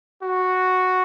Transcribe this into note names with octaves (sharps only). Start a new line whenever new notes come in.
F#4